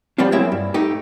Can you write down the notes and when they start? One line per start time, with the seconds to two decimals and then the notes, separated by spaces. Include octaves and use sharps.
0.18 F3 G3 B3 C4 D4 F4
0.32 F#3 G#3 A#3 C4 E4 E5
0.52 G2
0.74 A3 D#4 G4